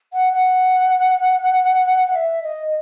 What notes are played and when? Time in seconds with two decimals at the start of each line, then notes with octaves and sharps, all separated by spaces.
0.13 F#5
0.33 F#5
2.13 E5
2.43 D#5